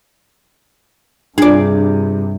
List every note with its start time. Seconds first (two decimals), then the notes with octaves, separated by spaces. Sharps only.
1.38 G2 C3 D4 F4 G#4 D5